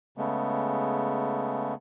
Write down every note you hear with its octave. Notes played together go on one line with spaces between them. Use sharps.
C#3 G#3 A3 B3